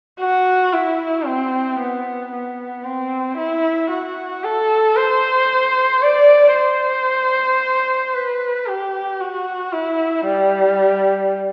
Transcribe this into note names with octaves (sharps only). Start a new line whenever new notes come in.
F#4
E4
C4
B3
B3
C4
E4
F#4
A4
C5
D5
C5
B4
G4
F#4
E4
G3